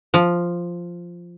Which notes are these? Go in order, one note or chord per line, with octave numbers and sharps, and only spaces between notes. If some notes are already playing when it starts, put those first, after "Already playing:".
F3